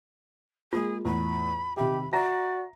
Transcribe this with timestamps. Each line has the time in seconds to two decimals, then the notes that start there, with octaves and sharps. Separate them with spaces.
0.73 G#3 A#3 F4 G#4
1.05 E2 A2 B5
1.77 C3 D#3 G4 E5 B5
2.13 F#4 D5 E5 A#5 A#6